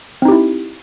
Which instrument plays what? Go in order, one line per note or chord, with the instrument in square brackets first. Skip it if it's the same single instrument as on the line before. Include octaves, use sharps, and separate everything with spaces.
[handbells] C4
D#4
G4
E4